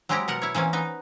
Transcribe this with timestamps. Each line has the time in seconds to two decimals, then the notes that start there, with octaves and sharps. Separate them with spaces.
0.09 F#3 G#3 C4 E4 G4 A#5
0.28 B2 A#4 F#5
0.42 E4 C#5
0.55 E3 A#3 C4 C#4
0.73 B3 D#4